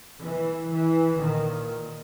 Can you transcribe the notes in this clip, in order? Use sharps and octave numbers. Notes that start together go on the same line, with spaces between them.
E3
E3
A#2 D#3